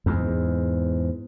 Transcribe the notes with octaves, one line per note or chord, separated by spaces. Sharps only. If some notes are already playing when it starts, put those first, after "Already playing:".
E2 G#2